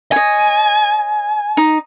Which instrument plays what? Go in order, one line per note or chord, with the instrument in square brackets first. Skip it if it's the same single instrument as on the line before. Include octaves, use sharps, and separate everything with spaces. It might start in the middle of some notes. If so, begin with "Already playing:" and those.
[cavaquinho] C#5 D#5 [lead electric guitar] G#5
[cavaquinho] D#4